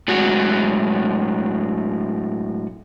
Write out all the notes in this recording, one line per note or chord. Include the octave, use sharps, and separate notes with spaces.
A2 F#3 G#3 F#4